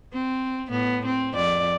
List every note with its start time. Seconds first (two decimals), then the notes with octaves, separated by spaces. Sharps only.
0.13 C4
0.70 A2 B3
1.06 C4
1.34 F2 D5